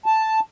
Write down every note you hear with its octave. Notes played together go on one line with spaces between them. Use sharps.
A5